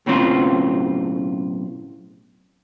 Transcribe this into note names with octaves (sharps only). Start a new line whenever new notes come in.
B1 A2 C#3 C4 F4